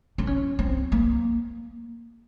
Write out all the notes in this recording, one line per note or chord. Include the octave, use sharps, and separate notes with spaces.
D4
C#4
C4
A#3